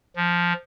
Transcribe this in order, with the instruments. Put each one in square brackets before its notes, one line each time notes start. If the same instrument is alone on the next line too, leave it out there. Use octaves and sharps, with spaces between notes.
[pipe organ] F3